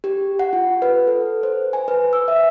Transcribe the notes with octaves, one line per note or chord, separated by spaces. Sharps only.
G4
F#5
F4
B4
A4
C5
G#5
B4
E6
E5